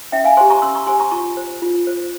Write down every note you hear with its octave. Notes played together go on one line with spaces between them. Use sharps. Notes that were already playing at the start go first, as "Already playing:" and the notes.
C#4 E5 G5
F5 G#5
G4 C5 G#5 C6
A#5 C#6
C#4 C6 E6
A#5 C#6
G4 C5 G#5 C6
A#5 C#6
F4 A#5 C#6
C5
F4
C5